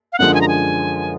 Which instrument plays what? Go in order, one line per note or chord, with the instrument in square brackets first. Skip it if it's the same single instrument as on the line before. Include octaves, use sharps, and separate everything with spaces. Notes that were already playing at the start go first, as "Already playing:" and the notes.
[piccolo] F5
[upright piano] F#2 D3 F3 G#3 [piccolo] F#5
[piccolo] G#5
A#5
G#5